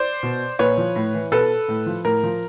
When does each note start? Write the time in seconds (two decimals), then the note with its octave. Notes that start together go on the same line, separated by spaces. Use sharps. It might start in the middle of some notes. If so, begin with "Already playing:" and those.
Already playing: C5 D5
0.23 B2
0.59 A#2 B4 C#5
0.77 F3
0.96 A2
1.14 E3
1.32 B2 A4 B4
1.68 A2
1.86 F3
2.05 A2 A#4
2.23 F3